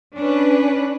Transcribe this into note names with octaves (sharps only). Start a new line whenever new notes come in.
C#4 D4 B4